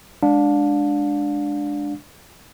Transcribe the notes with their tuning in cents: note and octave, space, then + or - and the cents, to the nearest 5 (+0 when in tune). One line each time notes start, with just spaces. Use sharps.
G#3 +0 D4 +0 F5 +35